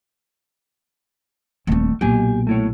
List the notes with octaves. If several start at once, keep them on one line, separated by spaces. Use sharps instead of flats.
D#1 D#3 A3 C4
B1 A#2 G4 G#5
A3 E4 C#5